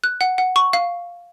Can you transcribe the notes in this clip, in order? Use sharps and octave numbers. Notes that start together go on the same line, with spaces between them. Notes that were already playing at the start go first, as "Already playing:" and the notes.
F#6
F#5
F#5
C#6
F5